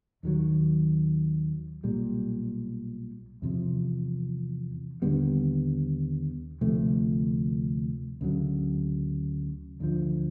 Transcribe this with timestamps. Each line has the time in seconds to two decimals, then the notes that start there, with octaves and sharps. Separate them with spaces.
0.23 D#2 D#3 F#3
1.83 B1 A#2 G3
3.42 E2 C3 F3
5.02 D#2 D3 G3 B3
6.61 D2 C3 F3 A3
8.21 D2 C#3 F#3
9.80 D2 D3 F3